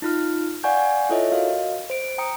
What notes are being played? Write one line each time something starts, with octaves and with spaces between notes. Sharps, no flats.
D#4 F4 F6
D5 F5 F#5 G#5 C#6 G6
E4 F4 A4 C#5 D#5 E5
F#4 A#4 D#5 F5
C5 D7
G5 A#5 D#6 C#7